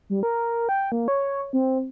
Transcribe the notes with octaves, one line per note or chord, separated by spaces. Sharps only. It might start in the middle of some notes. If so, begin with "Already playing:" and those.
G3
A#4
G5
A#3
C#5
C4